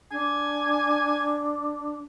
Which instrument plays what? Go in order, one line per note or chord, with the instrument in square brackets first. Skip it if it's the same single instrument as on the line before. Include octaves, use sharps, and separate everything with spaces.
[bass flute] D4 [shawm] G#5